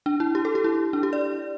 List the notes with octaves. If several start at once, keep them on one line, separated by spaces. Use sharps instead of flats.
D4
E4
G4
A4
G4
E4
D4
G4
D5